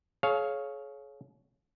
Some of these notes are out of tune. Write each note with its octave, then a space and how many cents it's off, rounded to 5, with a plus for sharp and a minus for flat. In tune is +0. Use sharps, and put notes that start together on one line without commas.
G#4 +40 C#5 +0 F5 +0